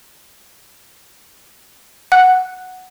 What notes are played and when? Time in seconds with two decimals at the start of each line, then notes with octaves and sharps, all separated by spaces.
2.12 F#5 F#6